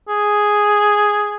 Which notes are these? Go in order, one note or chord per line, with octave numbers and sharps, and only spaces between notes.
G#4